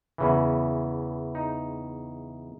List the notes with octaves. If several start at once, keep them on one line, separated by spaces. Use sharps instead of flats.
E2 C#3 E3
D#4